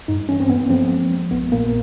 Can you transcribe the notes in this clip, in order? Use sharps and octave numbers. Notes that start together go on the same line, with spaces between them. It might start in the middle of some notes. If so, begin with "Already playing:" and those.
G2 D#4
E3 C#4
C4
A#3 B3
F3 C4
G#3
G#3
A#1 B3
A#2 A#3